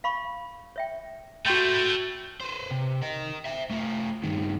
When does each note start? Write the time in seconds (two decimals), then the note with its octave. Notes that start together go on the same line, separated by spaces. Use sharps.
0.04 F5 B5 C#6
0.76 C#5 E5 G5
1.46 A3 E4 F#4 G5 C6 G6
2.41 B4 C5
2.71 C3
3.02 A#4 D#5
3.45 C5 E5
3.71 A3 F4
4.23 G2 D#3